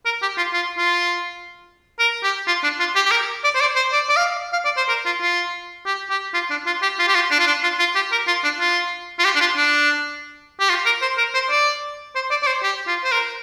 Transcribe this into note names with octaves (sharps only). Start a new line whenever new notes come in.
A#4
G4
F4
F4
F4
A#4
G4
F4
D4
F4
G4
G4
A#4
D5
C5
D5
C5
D5
D5
F5
F5
D5
C5
A#4
F4
F4
G4
G4
F4
D4
F4
G4
F4
G4
F4
D4
F4
D4
F4
F4
G4
A#4
F4
D4
F4
F4
G4
D4
F4
D4
G4
F4
A#4
C5
A#4
C5
D5
C5
D5
D5
C5
G4
F4
C5
A#4